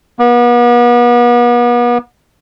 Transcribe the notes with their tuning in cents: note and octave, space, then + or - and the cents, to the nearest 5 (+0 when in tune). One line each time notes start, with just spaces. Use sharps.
B3 -40